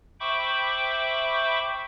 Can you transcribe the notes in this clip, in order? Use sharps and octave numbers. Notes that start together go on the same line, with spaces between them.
C5 E5 G5 B5 C#6 D6